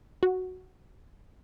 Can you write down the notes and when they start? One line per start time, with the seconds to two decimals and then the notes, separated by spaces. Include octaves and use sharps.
0.23 F#4